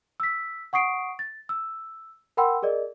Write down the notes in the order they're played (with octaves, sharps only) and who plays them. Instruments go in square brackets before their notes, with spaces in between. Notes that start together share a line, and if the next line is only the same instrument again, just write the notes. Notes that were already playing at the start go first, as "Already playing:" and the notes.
[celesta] E6 B6
F#5 C#6 D#6 C7 D7
A6
E6
A#4 F#5 G5 B5 C6 E6
G#4 A#4 D5 D#5